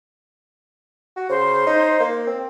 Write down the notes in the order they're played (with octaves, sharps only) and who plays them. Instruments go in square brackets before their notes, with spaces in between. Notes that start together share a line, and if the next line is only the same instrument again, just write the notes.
[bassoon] F#4
[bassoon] C#3 [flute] C5
[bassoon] D#4
A#3
C4